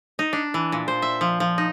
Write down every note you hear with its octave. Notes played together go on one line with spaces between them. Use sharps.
D#4
D4
E3
A#2
C5
E5
F3
F3
D#4